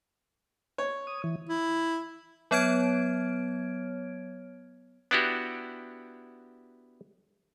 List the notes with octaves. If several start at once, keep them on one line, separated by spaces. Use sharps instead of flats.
C#5
D#6
E3
E4
F#3 B3 C#5 F6 G#6 D7
B3 D4 E4 F#4 G4